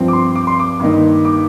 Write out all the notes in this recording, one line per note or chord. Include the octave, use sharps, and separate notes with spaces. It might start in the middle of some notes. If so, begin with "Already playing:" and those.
Already playing: G2 F3 C4
D6
C6
D6
C6
D6
G2 D#3 A#3 D#4
D6